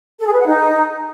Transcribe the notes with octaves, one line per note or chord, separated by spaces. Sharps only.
A4
G#4
B4
F#5
D#4